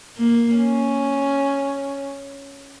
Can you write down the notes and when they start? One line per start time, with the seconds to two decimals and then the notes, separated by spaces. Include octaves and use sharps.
0.17 A#3
0.57 C#4